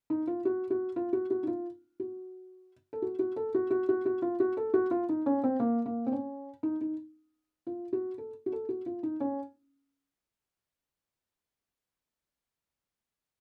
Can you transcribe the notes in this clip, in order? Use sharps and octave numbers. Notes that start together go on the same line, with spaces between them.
D#4
F4
F#4
F#4
F4
F#4
F#4
D#4
F4
F#4
A4
F#4
F#4
A4
F#4
F#4
F#4
F#4
F4
F#4
A4
F#4
F4
D#4
C#4
C4
A#3
A#3
C4
C#4
D#4
D#4
F4
F#4
A4
F#4
A4
F#4
F4
D#4
C#4